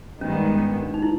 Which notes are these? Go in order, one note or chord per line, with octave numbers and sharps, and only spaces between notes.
G#2 D#3 G3 B3 C#4
C#4
D4
D4
D#4
E4